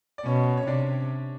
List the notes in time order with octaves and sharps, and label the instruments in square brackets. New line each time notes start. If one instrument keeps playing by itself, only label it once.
[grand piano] D5
[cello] B2 [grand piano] C#4 C#5
[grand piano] C#5
[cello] C3 [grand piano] D4 D5